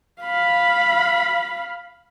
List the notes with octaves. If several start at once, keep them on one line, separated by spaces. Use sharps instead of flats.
F5 B5